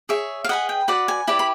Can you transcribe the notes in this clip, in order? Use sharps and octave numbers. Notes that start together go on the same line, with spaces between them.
G#4 C#5 E5
F5
G#4 B4 D#5 F#5
G5
F#4 B4 D5 F#5
G#5
E4 G4 B4 D5
B5